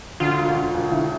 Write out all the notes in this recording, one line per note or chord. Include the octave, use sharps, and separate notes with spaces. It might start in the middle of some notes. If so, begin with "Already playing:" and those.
D2 F4
E1
D2
E1
D2 E4